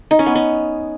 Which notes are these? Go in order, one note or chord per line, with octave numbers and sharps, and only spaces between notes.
D#4
C#4
B3
C#4